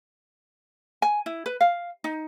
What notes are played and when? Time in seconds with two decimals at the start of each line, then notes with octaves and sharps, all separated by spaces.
1.02 G#5
1.26 E4
1.46 B4
1.61 F5
2.04 D#4